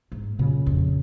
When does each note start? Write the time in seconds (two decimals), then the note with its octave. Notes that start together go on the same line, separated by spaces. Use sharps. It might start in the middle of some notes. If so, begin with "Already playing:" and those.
0.12 G#2
0.39 F#2 A#2 C#3
0.66 F2